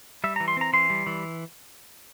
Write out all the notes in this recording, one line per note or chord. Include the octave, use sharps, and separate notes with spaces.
G3 E5
A#5
E3
C6
C4 A#5
E3 C6
G3
E3